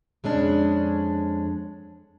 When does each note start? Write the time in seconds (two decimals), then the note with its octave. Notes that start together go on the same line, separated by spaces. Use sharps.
0.24 F2 G#3 C#4 D4